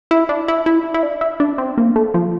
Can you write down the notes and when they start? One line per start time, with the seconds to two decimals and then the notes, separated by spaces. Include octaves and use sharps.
0.11 E4
0.29 D4
0.48 E4
0.66 E4
0.94 E4
1.03 D4
1.21 E4
1.40 D4
1.58 C4
1.78 A#3
1.96 A3
2.14 F3